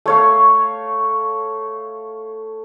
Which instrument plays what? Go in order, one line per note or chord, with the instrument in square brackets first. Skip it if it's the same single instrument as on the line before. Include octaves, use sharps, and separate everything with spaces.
[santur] A3 C#5 F5